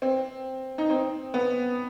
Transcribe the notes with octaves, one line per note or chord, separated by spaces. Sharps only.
C4
D#4
C4
B3